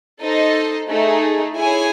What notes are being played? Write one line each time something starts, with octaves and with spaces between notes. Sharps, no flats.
D#4 A4 C5 D#5
A3 D#4 G#4
E4 G#4 C#5 G#5